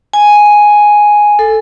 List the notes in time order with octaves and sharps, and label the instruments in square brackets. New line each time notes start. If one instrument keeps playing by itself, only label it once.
[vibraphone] G#5
A4